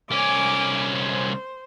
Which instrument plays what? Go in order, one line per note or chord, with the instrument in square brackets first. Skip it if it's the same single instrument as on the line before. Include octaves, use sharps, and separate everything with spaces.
[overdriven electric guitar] C2 C#4 [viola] G#5 D6
[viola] C5